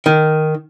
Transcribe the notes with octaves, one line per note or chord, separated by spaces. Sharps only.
D#3